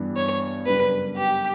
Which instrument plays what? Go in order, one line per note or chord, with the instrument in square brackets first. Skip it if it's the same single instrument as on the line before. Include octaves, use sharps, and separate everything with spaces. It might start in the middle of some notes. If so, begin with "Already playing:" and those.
Already playing: [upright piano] G2 E3 G3 B3
[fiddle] C#5
[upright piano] F#2 C#3 G3 B3 D4 [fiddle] B4
[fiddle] G4